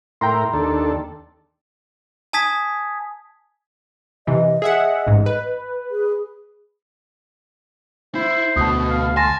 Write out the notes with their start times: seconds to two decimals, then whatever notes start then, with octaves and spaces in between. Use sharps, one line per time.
0.21 A2 E4 A#4 G5 A#5 C6
0.53 D#2 D4 A4
2.33 G#5 A5 D#6 G#6 B6
4.27 C3 E3 D#5
4.62 G#4 E5 F#5
5.07 A1 G#2
5.26 B4
5.91 G#4
8.15 E4 C5
8.56 D2 B2 A5 D#6
8.90 F5
9.17 G#5 A5 C6 A#6